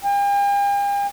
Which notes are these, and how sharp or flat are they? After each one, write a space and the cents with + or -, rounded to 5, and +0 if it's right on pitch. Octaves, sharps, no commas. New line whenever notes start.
G5 +45